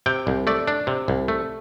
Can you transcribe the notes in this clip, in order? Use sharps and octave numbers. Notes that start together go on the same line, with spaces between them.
C3 G5
C2
A3 D5
D4
C3
C2
A3